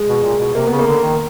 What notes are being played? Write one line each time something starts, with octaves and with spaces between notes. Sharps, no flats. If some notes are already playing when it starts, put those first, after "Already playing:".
Already playing: G#3
B2
A#2
B2
C3 A#3
C#3 B3
A#3
D3
D#3